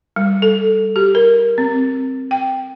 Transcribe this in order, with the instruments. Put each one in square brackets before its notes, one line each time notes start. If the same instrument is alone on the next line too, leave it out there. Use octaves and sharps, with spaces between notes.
[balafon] G3
A4
G4
A#4
C4
G5